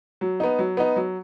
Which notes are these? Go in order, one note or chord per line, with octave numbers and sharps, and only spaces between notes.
F#3
B3 D#4
F#3
B3 D#4
F#3